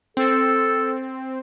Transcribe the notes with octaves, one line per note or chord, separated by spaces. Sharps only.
C4 A4